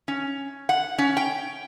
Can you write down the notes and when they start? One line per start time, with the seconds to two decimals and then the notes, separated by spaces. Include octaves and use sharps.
0.08 C#4
0.69 F#5
0.98 C#4
1.17 G5